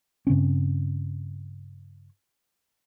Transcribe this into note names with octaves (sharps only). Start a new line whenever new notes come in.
G2 C#3 C4 C#4